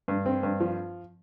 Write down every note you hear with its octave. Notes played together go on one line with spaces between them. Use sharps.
G2
C4
G2
F3